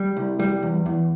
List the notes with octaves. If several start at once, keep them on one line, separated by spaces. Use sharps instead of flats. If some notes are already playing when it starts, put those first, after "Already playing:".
Already playing: G3
C2
G3
E2
E2